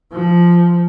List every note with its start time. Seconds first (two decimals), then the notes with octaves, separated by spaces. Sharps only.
0.13 F3